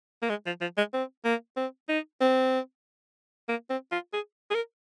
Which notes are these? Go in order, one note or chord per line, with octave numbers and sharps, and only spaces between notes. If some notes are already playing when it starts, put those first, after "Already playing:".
A#3
G#3
F3
F3
G#3
C4
A#3
C4
D#4
C4
A#3
C4
F4
G#4
G#4
A#4